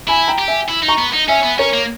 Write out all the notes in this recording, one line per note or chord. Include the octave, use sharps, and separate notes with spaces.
E4 G#5 B5
G5 A#5
G4
E5 G#5
E4
D#4
A#5 C#6
B3
D#4
C#4 E5 G#5
B3
C#4 A#4 C#5
A#3